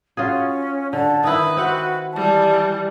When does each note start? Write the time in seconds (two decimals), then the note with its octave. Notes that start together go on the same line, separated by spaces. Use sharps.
0.17 C#4 F4 F#4 G#4
0.93 D3 A5
1.24 D#3 E4 B4 D#6
1.57 C4 F#4 F#5
2.13 E3 G3 A5